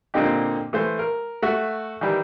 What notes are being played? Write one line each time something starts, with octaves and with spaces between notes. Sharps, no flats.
A#2 D3 A#3 C4 D#4 G4
E3 A3 C5
A#4
A3 F#4 E5
D#3 E3 G3